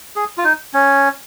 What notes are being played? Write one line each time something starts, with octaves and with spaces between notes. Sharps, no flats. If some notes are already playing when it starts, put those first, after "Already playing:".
G#4
F4
D#4
C#4